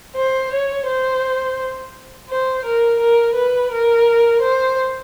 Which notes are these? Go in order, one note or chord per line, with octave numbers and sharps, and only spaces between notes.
C5
C#5
C5
C5
A#4
A#4
B4
A#4
C5